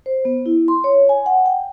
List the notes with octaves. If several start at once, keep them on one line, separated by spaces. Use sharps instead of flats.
C5
B3
E4
C6
C#5
G#5
F#5
G5